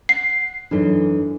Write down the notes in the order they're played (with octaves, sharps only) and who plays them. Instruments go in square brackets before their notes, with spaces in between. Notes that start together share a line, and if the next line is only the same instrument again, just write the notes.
[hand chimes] F#5 [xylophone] C7
[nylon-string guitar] F#2 E3 [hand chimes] D4 D#4 A4